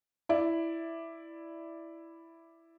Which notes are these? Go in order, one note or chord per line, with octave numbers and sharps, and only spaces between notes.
E4 D5 E5